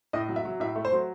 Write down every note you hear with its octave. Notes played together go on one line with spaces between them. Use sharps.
A2 D#5
F#3
E5
F#3
A2 E5
A3
C5
F#3